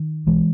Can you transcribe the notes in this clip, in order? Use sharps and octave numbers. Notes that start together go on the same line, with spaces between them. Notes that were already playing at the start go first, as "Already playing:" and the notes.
Already playing: D#3
B1 E3 G#3